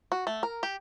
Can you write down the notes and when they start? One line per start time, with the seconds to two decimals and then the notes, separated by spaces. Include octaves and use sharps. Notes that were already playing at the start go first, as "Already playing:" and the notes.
0.12 F#4
0.27 A3
0.43 A#4
0.63 G4